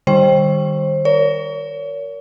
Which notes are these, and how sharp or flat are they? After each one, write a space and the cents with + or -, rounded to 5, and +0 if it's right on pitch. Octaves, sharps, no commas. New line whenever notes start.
D#3 -30 G3 +0 C5 +25
A#4 +0 C#5 +35